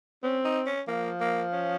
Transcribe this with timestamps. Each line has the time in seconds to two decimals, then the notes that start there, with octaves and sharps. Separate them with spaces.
0.23 C4 C#4
0.45 D#4
0.66 C#4
0.88 F3 A#3
1.21 A#3
1.53 C#4